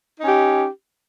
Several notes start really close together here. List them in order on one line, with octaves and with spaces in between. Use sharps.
D#4 C#4 G4